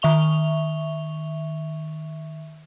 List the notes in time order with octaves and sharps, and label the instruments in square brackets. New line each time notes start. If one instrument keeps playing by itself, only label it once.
[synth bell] D#3 E5 C#6 F7 G7